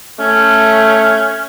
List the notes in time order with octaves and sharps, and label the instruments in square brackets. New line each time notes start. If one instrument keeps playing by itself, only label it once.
[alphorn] A3 [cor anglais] C#4